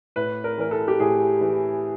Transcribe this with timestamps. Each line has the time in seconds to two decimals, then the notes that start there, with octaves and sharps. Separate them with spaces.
0.16 A2 B4
0.44 A#4
0.58 E3 A#4
0.71 A4
0.88 G4
1.00 A2 G#4
1.41 E3